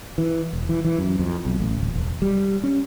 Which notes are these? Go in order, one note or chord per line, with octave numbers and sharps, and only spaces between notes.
E3
E1
E3
E3
F#2
F2
B1
A1
D1
E1
G3
C#4